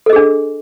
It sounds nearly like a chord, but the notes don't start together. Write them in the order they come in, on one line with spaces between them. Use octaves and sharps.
A4 D#5 G#4 D4